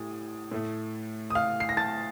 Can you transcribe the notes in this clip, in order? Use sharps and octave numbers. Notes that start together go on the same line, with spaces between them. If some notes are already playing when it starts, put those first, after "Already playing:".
Already playing: A2 G3 D#6
A2 A3
D#6
F5 F6
C7
A#6
A5 A6